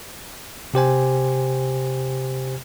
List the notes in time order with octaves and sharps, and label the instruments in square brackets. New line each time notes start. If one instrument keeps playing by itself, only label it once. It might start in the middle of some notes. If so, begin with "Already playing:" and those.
[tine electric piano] C3 G4 C5 G#5